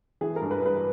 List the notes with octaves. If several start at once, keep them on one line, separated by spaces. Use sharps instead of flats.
E3 G#4
G2 A#4
B4
G2 B4